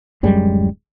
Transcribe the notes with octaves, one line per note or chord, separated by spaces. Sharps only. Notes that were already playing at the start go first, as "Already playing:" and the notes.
D1 F#2 G3 G#3